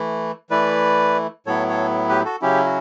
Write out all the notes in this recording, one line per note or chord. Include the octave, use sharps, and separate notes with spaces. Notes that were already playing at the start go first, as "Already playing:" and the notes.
Already playing: E3 A3 E4
E3 A3 E4 B4 D5
A2 F#3 B3 E4 A4 C#5
A4 C#5
G4 B4
F#4 A4
C#3 F#3 C#4 E4 G4
F#4